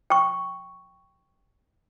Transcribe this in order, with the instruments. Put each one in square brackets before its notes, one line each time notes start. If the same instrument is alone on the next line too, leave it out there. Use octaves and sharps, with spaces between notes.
[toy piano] G5 C#6